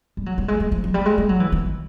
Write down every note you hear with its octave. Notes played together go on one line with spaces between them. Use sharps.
G3
F#3
G3
G#3
G3
F3
F#3
G3
G#3
G3
F#3
E3
D#3